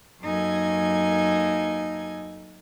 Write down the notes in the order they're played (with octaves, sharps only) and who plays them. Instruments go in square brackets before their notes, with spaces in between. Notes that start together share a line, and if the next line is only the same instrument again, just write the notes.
[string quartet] F#2 A#3 D#4 A4 G#5 G#6